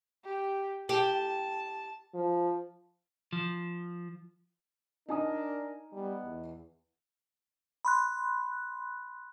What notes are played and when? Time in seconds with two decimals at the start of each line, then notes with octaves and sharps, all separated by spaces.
0.24 G4
0.89 G4 A5
2.14 F3
3.33 F3
5.09 D4 D#4 A#4 G#5 D#6
5.93 G3 B3
6.24 E2
7.85 B5 C6 F#6